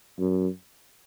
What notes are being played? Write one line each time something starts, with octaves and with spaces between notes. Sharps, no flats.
F#2